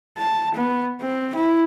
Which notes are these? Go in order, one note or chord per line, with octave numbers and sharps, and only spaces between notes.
A5
B3
C4
E4